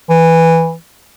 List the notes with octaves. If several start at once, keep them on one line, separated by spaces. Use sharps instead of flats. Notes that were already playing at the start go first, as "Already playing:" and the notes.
E3